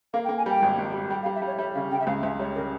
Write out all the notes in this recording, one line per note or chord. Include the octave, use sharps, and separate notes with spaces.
A#3 F5
G5
A#3
G#5
G3 G5
G#1
G#1
G3
G3 G5
F5
G3
E5
G3 C#5
G3 E5
C#3 F5
C#3 G5
E5
C#2 F5
C#2 E5
G3 C#5
C#3 A#4